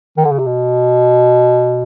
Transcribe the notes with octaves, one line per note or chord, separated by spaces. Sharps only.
D#3
D3
C#3
C3
B2